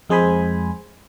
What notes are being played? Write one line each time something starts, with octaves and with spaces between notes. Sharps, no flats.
F2 G#3 G#4 C5 G#5 B5